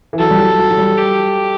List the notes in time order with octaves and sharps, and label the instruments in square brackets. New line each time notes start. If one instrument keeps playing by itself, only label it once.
[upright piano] E3
[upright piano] F#3 [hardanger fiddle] A4
[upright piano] G3
F#3
F#3
F#3
G3
[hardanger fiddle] G4